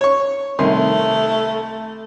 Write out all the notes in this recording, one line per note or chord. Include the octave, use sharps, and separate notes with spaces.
C#5 C#6
C2 D#3 A3 C6